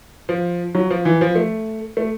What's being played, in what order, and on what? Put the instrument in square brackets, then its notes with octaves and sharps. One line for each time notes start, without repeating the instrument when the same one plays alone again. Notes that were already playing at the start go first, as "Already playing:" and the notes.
[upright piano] F3
F#3
F3
E3
F3
A3
A3